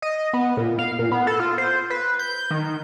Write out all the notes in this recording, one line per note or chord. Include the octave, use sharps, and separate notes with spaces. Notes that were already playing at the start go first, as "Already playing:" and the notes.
D#5
B3
A#2
F5
A#2
B3
A4
F4
C5
B4
G6
D#3